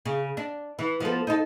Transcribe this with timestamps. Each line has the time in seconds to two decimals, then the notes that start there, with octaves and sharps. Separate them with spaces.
0.05 C#3
0.37 D4
0.79 E3
1.00 F3 B3 A4
1.27 D#4 A4